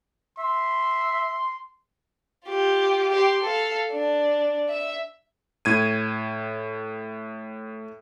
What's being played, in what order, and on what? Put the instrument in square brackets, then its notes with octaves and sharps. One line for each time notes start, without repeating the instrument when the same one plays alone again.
[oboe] E5 [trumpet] C6
[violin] F4 G4
G4 C6
A4 F5
D4
E5
[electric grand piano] A2 G#6 D#7